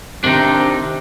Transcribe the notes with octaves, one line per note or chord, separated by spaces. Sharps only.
C3 D#3 C4 D4 D#4